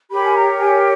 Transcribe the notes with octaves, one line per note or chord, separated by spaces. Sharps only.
G4 A#4 C#5 B5
G#5
A#5
G#5